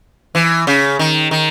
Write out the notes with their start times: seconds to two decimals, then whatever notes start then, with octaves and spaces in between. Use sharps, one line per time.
0.35 E3
0.67 C#3
0.99 D#3
1.31 D#3